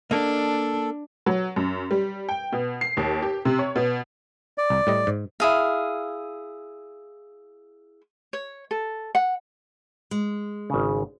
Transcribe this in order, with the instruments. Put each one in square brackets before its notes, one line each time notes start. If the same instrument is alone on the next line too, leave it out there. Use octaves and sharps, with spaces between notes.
[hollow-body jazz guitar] A#3 D#5 [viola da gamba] D4 [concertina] A4
[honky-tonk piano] F#3
F#2
G3
G5
B2
C7
D#2
G4
C3
C#5
B2
[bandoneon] D5
[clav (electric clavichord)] C2
A2 G3 D#5
G#2
[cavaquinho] E4 G#4 F5
[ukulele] C#5
A4
F#5
[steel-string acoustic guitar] G#3
[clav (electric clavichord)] G#1 C#3